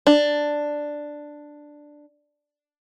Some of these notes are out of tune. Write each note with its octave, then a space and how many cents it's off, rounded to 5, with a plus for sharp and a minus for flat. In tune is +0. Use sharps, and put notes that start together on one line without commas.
D4 +5